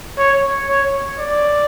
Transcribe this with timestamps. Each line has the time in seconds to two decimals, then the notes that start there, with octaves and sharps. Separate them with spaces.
0.18 C#5
0.69 C#5
1.19 D5